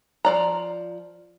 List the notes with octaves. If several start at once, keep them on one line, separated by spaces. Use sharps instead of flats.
F3 D5 A#5